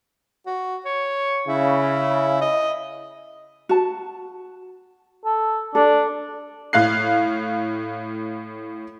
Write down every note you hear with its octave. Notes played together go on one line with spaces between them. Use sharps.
F#4
C#5
C#3 E4
D#5
F#4 A5
A4
D4 A4
A2 F5 F#6 C7